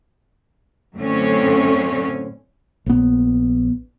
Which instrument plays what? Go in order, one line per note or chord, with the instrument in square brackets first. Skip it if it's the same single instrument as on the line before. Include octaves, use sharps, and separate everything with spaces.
[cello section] F#2 A2 D3 C4 C#4
[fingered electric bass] A#1 B3